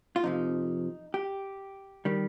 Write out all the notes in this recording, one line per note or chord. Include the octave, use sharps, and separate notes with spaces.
F4
F2 C3 F3 D#4
G4
D#3 G3